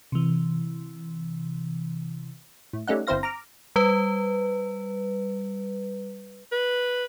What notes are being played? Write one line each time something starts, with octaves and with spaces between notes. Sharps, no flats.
C3 E3
A2
G3 A3 C#4 D#4 F#5
G1 C4 E4 C5 F5 A#6
A#5 D6 F6
G3 B4
B4